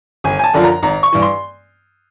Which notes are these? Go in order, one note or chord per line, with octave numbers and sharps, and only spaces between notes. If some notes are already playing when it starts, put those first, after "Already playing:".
G1 G#5
G#5
A5
F#2 D3 F3
A#5
G#1 A#5
C#6
G2 E3
C6